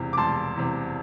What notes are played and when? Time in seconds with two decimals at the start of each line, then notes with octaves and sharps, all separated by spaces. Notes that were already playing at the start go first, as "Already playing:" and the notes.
Already playing: E1 E2 C3
0.13 D6
0.17 E1 A5 C6
0.56 E2 C3